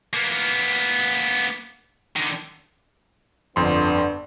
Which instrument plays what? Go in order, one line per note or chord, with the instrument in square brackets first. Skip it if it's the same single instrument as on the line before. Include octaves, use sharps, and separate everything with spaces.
[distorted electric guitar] A#3 B3
D3 D#3
[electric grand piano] G1 F2 C6 [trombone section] D3 B3 D4